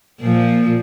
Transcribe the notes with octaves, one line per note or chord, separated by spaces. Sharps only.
A#2 F3